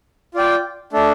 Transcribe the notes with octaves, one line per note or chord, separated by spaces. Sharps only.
F4 D5 G5
A3 D4 A4